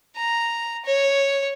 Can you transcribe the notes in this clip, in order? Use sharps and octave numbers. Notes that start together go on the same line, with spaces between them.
A#5
C#5